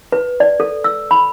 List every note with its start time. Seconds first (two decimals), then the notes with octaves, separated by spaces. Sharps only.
0.12 B4
0.40 D5
0.60 A4
0.84 E6
1.11 B5